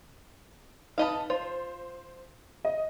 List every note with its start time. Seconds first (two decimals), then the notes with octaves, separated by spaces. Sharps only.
0.98 D#4 B4 D#5 F5 A5
1.30 F4 C5
2.65 D#5